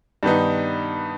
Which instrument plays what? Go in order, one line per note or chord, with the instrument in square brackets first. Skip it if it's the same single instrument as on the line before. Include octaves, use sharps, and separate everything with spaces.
[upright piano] G2 D#3 B3 D#4